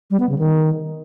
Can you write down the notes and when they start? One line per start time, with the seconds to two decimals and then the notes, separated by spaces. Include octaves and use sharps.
0.11 G3
0.20 B3
0.29 C#3
0.39 D#3